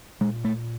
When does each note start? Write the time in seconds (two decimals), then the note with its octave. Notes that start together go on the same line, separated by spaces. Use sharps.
0.21 A#2 G#3
0.44 A3